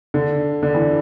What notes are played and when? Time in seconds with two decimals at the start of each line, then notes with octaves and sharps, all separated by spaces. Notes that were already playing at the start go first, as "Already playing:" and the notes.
0.14 D3
0.63 D3
0.75 E3